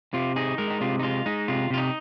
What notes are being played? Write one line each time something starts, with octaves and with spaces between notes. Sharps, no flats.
C3 F4
D#4 G#4
G#3 A#4
D#4
C3 F4
D#4
G#3 F4
G#3 D#4
C3 F4
C3 F4
D#4